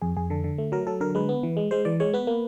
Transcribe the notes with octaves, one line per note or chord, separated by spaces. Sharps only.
F2 G#4
F2 G#4
D3 A4
D3
A3
F#3 A#4
F#3 A4
D3 A#4
G#3 B4
B3
E3
G#3
G#3 C5
E3 D5
G#3 C#5
B3 B4
A#3